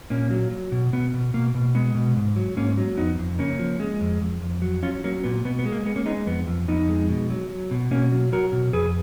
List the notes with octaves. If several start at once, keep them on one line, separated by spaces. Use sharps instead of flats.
A#2 A#3 C#4
F#3
F#3
B2
B2 B3
B2
B2 A#3
B2
G#3 B3
B2
G#2
F#3
G#2 A#3 C#4
F#3
F2 B3 D#4
F2
C#3 A#3 C#4
F3
G#3
F2
F2
F2
F#3
F#3 C#4 F4
F#3 A#3 C#4
A#2 B3
B2 B3
B3
G#3
A#3
G#3 B3
A#3 C#4
G#3 B3 D#4
F2 B3
F2
F2 B3 D#4
G#3
B2
F#3
F#3
B2
B2 A#3 C#4
F#3
F#3 F#4 A#4
B2
F2 G#4 B4